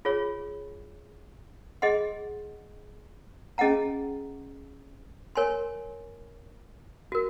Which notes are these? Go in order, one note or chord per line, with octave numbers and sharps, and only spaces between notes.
F4 G#4 C#5
G#4 D#5 F#5 C6
C#4 G#4 D#5 F#5 A#5
A#4 C#5 G#5 C6
F#4 A#4